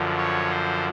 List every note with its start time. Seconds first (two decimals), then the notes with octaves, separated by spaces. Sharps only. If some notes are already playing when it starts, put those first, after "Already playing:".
Already playing: F#2 D3 F3
0.17 C#5
0.50 C5